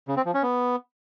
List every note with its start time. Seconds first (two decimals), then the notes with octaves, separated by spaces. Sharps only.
0.08 C#3
0.17 C4
0.25 F3
0.34 C#4
0.43 B3